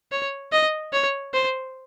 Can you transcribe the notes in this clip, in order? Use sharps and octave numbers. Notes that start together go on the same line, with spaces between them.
C#5
D#5
C#5
C5